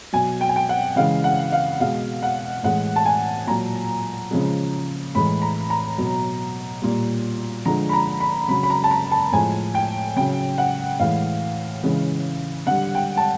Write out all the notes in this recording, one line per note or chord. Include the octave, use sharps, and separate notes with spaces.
B2 F#3 G#5
G5
G#5
G5
F#5
C#3 E3 G#3 F5
F#5
F5
B2 G#3 F5
F#5
A2 E3 G#3 F#5
A5
G#5
A#2 F#3 A#5
C#3 F3 G#3
A2 E3 G#3 B5
A#5
A#5
B2 F#3
A#2 G3
D3 F3 G#3 A#5
B5
A#5
B5
C#3 F#3 B5
B5
A#5
A5
A#5
A5
A2 F3 G#3 G#5
G5
C#3 F#3 G5
F#5
A2 E3 G#3 F5
C#3 E3 G#3
D3 G3 F#5
G5
A5